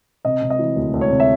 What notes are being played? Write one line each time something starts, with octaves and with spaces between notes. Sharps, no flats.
C3 D#5
C3
D#5
E3
D2
D2
C#5
C3
E5